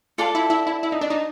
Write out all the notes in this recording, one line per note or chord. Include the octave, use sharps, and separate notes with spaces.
F4 A4 D5 F#5 A5
E4
E4
E4
E4
D#4
D4
D#4